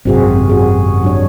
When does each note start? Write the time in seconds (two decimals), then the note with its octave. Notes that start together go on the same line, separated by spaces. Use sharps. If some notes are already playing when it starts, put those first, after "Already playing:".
0.05 G#1 F#2 C3 C4 F#4 G#4
0.49 F#4 G#4
1.03 F#3 D4 C#5